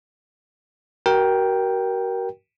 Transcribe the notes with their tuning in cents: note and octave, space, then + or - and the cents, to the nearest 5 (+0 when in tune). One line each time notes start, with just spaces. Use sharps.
F#4 +35 A#4 +15 G5 +0